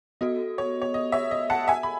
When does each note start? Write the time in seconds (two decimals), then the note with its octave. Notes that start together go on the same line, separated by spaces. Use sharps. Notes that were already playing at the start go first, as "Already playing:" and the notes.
0.21 B3 F#4 A4 D#5
0.58 C#5
0.82 C#5
0.94 D#5
1.12 C#5 E5
1.31 D#5
1.50 F#5 A5
1.68 E5 G#5
1.83 B5